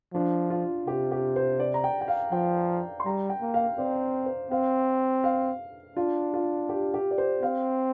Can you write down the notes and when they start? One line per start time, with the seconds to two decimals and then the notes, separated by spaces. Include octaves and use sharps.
0.14 F3 D4
0.50 F4
0.86 C3 G4
1.12 G4
1.36 C5
1.59 D5
1.74 A#5
1.84 G5
2.01 G5
2.08 F5
2.32 F3 G5
3.00 C6
3.06 G3 A#5
3.30 G5
3.41 A#3
3.54 F5
3.78 C4 D5
4.26 C5
4.51 C4 F5
5.24 F5
5.96 D4 F4
6.34 F4
6.69 G4
6.94 G4
7.11 D5
7.18 C5
7.43 C4 F5